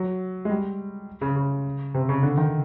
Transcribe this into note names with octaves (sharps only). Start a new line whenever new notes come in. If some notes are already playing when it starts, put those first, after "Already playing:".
Already playing: F#3
G#3
G3
C#3
C#3
C3
C#3
D3
D#3